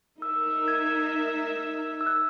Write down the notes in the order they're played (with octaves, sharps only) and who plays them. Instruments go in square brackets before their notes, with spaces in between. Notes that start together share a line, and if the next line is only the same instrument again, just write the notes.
[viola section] D#4 A#4 E5 [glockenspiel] E6
[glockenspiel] G#6
E6
F#6